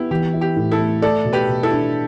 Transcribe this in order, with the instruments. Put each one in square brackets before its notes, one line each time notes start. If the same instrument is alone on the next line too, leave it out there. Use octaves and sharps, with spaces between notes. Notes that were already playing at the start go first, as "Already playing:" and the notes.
Already playing: [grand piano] B3 [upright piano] E4 G4
[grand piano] E3 [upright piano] G4
[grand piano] E4
[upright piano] G4
[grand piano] A2
[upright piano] E4 A4
[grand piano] A3
[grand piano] A3 [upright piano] A4 D5
[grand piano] B2
[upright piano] G4 B4
[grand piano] B2
[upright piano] E4 A4
[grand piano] D4